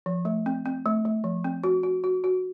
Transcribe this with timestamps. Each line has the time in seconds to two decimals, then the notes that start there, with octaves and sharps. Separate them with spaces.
0.06 F3
0.25 A3
0.46 C4
0.66 C4
0.86 A3
1.05 A3
1.24 F3
1.44 C4
1.64 F#4
1.83 F#4
2.04 F#4
2.24 F#4